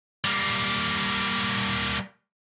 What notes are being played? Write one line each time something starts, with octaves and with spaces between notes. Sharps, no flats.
G3 A#3